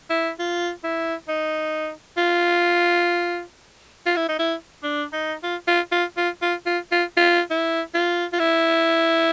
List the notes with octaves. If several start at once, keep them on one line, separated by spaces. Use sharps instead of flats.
E4
F4
E4
D#4
F4
F4
E4
D#4
E4
D4
D#4
F4
F4
F4
F4
F4
F4
F4
F4
E4
F4
F4
E4